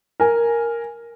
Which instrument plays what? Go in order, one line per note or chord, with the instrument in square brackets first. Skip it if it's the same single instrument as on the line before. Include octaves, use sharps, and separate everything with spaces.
[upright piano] A#4 G#5